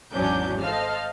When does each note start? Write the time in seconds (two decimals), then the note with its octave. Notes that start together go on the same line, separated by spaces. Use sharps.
0.12 G#1 E2 F#3 C#4 D4 G6
0.60 A4 C5 D#5 F5 A5 F6